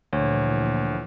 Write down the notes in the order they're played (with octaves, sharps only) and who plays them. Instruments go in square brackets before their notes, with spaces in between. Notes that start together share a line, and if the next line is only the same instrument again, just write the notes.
[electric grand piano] D2 [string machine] A#2 E3 F3 [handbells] C#5